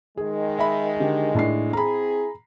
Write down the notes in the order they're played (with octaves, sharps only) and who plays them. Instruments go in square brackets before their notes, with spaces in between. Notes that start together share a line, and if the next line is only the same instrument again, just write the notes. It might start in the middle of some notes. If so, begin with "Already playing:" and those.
[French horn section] D#3 G#3 [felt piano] G#4
[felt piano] D#5 E5 B5
D3 G4
A2 D4 C7
[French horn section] C4 E4 G#4 [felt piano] A#5 B5